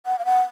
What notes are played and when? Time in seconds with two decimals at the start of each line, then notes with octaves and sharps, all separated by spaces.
0.06 F#5
0.19 F5
0.25 F#5